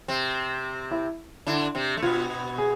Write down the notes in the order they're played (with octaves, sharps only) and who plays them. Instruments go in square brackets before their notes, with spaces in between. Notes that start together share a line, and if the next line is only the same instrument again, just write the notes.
[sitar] C3 C4
[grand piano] E4
[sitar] D3 D4 [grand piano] E4
[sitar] C3 C4
A3
[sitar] B2 B3 [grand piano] F4
[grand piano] G#4